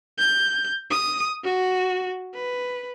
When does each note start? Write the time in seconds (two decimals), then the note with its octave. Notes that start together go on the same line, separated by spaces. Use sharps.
0.18 G6
0.90 D#6
1.43 F#4
2.34 B4